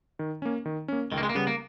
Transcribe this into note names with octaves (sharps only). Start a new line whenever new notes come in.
D#3
A#3 C#4
D#3
A#3 C#4
C#2 D#3
A#3
G#3
A#3
C#3 G3 B3
A#3